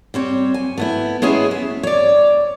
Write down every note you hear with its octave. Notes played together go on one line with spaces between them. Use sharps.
G3 C4 C#5
G#5
A3 B3 E4
G#3 B3 C#4 E4 G#4
E5
C#5 D5